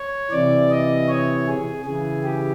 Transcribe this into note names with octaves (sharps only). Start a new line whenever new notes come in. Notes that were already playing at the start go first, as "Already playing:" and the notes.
Already playing: C#5
C3 E3 D5
D#5
C#5
G#4
C#3 E3 G#4
G4